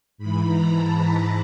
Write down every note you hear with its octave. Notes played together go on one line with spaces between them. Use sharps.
G#2 E3 B5
A#5
A5
A5